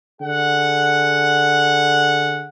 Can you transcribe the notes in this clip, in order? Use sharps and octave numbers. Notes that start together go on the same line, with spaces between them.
D3 G#4 F#5